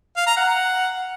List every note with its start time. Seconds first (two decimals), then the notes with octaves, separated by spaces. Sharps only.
0.17 F5
0.27 A#5
0.37 F#5